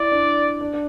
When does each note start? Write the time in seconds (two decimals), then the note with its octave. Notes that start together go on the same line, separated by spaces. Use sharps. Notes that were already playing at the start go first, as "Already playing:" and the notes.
Already playing: E4 D5
0.12 D4
0.61 D4
0.73 D4